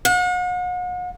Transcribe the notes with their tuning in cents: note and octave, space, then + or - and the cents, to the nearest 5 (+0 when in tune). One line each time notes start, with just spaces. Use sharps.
F#5 -40